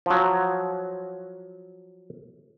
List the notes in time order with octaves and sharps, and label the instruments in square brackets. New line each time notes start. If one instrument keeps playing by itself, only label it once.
[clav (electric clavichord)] F3 F#3